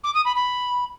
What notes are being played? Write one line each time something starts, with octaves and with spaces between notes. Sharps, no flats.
D6
D#6
B5
B5